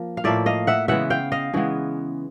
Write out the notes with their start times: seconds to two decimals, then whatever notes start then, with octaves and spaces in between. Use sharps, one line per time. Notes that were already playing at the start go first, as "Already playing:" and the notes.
Already playing: F3 A#3
0.17 F5
0.24 A2 F3 A#3 D5 E5
0.46 D#5 F5
0.67 E5 F#5
0.88 C#3 E3 G#3 B3 E5 F#5
1.10 F5 G5
1.32 D#5 F5
1.53 C#3 E3 G#3 B3